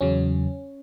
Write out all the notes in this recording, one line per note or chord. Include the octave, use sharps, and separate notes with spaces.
E2 C#3 F#3 C#4